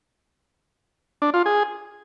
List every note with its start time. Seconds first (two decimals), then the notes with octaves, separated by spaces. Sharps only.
1.22 D4
1.34 F4
1.46 G#4